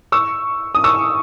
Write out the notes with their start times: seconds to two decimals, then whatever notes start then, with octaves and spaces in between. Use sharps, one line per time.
0.12 C#6 E6
0.75 D#6
0.84 C#6 E6